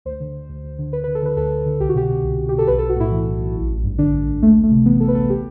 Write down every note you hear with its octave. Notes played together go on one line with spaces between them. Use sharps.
D2 C5
D3
D3
D2
D2
D3
D2 B4
B4
D3
A4
D3 B4
D2 A4
D2
D3
C2 G4
F#4
B2 G4
B2
C2
C2
B2 G4
A4
B1 B4
A4
B1
F#4
A2 E4
E3
B1
B1
A1
A1
G2
D3 D4
A1
A1
D2 A3
D2
A3
C3
E3 B3
D2 A4
B4
D2 A4
G4